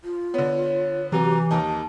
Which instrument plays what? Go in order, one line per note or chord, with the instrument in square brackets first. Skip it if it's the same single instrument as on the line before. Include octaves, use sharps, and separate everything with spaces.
[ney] F4
[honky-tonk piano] D3 B3 [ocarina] C#5
[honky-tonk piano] C3 F#3 [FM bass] E3 [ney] G4 [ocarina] A#5
[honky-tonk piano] D#2 A#3 D#4 [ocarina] A5